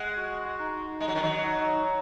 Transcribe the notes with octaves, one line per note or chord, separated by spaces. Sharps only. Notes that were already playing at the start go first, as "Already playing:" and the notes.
Already playing: G#3 F#5
F#4
D#4
G#3 D#5
F#3
D#3
F#3
D#4
D#4